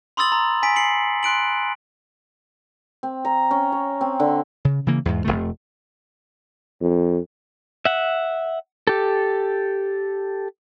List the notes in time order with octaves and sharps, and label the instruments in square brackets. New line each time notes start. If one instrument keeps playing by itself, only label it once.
[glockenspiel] B5 C6 D#6 E6 A6 F#7
A#5
G#5 B6 D7
C7 C#7 F#7
C6 F#6 D7 F#7
[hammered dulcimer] C4
A#5
C#4
C#5
C4
D3
[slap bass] C#3
C#3 E3 A#3
E2 G#2
F1 C#2 C3 A3
[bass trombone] F2
[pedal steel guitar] E5 F#5
G4 A4